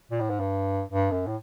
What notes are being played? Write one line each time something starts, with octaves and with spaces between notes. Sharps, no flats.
A#2
A2
G#2
G2
G2
F#2
A2